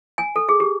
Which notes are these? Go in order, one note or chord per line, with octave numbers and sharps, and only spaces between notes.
G#5
A4
G#4
G4